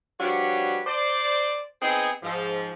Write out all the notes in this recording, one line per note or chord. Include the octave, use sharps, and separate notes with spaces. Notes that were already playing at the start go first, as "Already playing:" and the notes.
F3 G3 D4 F#4 B4 C#5
C5 D5
B3 C4 D#4 G#4
G#2 F3